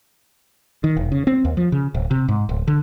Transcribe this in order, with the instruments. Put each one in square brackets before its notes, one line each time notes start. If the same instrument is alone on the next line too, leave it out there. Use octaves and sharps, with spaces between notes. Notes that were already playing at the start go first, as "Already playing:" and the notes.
[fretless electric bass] D#3
E1
C#3
C4
D#2
F3
C#3
D1
C3
G#2
D1
D3